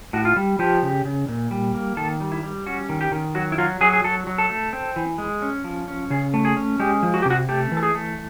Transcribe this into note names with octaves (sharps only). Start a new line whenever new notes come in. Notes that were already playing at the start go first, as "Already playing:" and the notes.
A2 F#4
F4
G3
F3 G4
C#3
C#3
A#2
G3
A#3
D#3 A4
G3
E4
G3
C#4 F#4
D#3
G4
D#3
F#3 F#4
E4
F#3 F4
F#3 G#4
G#4
F#3 A4
F#3
A4
A3
C4
E3
G#3
C#4
F3
C#4
C#3 G#4
A3
G#4
C#4
G#3 G4
F3
F#4
G4
C3
F#4
A3 G4
E3
A4
G#4
A3